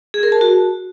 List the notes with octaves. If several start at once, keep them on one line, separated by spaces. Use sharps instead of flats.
G#4
A#4
A5
F#4